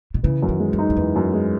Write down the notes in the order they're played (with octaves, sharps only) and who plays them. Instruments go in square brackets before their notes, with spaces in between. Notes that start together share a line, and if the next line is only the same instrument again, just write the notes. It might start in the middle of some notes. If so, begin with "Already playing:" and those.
[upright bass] B2
[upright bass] C#3 [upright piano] E3
[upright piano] F#2
[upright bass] D#3
[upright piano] G#3
[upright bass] F#2
[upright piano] D#4
[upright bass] F#2
[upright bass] E2 [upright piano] E3
[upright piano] F#2
G#3